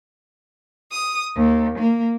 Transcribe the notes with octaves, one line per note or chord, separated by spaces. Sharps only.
D#6
D#2
A#3